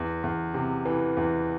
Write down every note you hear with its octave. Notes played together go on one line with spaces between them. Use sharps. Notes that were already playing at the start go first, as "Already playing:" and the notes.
Already playing: E2
E2
C3
E3
E2